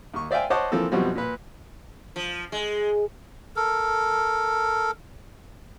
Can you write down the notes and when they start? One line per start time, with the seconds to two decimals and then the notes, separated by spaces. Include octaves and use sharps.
0.14 D#2 C#6
0.31 C5 D5 E5 F5 G5 G#5
0.50 C5 C#5 D#5 F#5 A5 D6
0.72 E3 F3 A#3 C4 A4
0.92 F#2 B2 F3 G3 C4 F#4
1.15 A#2 B4
2.16 F3
2.52 G#3
3.56 A4 A#4